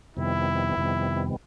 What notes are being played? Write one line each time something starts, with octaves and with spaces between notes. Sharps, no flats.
F2 C3 D#3 G3 B3 E4
F2 C3 D#3 G3 B3